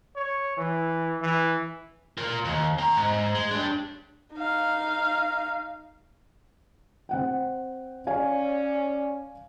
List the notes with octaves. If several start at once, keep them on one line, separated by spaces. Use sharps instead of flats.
C#5
E3
E3
F4 A#4
D#2
C4 A#5
G#2
G#3
D4 G4
D#4 F5
C4 F#5 G5
C#4 C#5 D5 F5 G#5